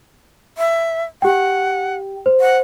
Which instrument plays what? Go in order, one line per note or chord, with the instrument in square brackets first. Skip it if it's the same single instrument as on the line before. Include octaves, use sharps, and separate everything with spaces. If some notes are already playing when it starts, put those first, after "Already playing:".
[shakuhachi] E5
[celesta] G4 G5 [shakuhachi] F#5
[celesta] C5
[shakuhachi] F#5